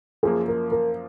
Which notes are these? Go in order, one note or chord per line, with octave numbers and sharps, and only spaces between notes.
F#2 F3 A#3 G#4
A#4
A#4